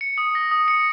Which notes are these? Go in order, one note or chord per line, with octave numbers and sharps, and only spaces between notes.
C#7
D#6
A#6
D#6
C#7